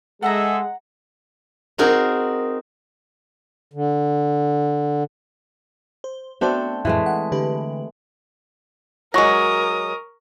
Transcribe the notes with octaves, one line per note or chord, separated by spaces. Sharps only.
G#3 G#4 A4 E5 F#5 A5 A#5
C4 D#4 F#4 G#4 A#4
D3
C5
A3 B3 C4 D4 F#4 C5
F2 A2 E3 G#3 A3
F#5
D3 G4 B4
F#3 G#3 A#4 C#6 D#6 A#6